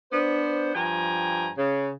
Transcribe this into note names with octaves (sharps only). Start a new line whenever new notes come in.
B3 D4 C5
G2 F3 G5 G#5 A#5
C#3